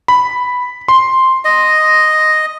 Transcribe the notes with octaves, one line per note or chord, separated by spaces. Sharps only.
B5
C6
D#5